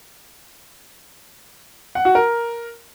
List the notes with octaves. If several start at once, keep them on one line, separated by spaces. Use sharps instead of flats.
F#5
F#4
A#4